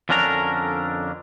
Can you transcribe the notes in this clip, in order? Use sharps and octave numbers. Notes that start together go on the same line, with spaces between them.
F2 D3 C#4 D4 A#4 A#5